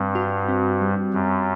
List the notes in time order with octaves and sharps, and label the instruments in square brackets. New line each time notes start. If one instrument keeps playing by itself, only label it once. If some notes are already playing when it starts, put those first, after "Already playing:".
Already playing: [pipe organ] G2 [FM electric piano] G3 C4
[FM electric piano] F#4
C4
G3
[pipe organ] F#2 [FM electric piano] G3